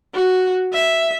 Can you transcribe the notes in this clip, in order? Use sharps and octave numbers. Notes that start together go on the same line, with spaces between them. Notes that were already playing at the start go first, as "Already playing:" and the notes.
F#4
E5